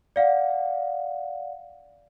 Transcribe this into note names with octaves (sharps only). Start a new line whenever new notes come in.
D5 F5 F#5